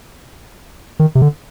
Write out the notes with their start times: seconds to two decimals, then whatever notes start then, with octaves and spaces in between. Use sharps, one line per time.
1.00 D#3
1.15 C3
1.22 D3